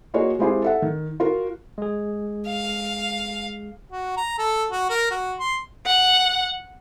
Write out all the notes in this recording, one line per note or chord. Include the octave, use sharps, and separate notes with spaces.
A#3 F4 F#4 G#4 C#5 D#5
G#3 C4 E4 F4 G4 G#4
A4 E5 F#5
D#3
F4 F#4 A#4
G#3 G#4
F5
F#4
A#5
A4
F#4
A#4
F#4
C6
F#5